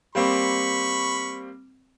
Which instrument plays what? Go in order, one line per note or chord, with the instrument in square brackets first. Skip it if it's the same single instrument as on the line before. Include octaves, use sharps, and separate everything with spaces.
[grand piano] G3 A#3 C4 [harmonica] B5 C#6